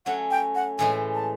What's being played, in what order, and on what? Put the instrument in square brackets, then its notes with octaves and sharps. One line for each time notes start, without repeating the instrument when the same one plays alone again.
[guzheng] F#3 A3 C#4 [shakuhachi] F#5
[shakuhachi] G5
F#5
[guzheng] A2 E3 G#3 [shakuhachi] G#5
[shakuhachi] A5